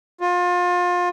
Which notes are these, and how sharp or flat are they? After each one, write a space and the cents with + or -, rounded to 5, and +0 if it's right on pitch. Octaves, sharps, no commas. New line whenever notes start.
F4 +30